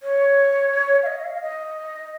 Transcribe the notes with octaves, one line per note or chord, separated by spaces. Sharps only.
C#5
F5
D#5
F5
F5
D#5